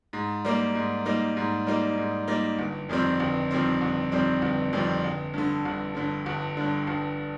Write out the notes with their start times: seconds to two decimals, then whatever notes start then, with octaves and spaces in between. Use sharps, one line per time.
0.13 G#2
0.45 G3 A#3 D#4
0.75 G#2
1.05 G3 A#3 D#4
1.37 G#2
1.67 G3 A#3 D#4
1.98 G#2
2.28 G3 A#3 D#4
2.59 G1
2.89 F2 D#3 G3 C4
3.20 G1
3.51 F2 D#3 G3 C4
3.81 G1
4.12 F2 D#3 G3 C4
4.42 G1
4.73 F2 D#3 G3 C4
5.04 G1
5.34 G2 D3
5.65 G1
5.95 G2 D3
6.26 G1
6.57 G2 D3
6.87 G1